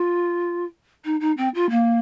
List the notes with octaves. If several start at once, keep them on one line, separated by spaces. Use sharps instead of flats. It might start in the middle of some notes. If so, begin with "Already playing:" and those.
Already playing: F4
D#4
D#4
C4
F4
A#3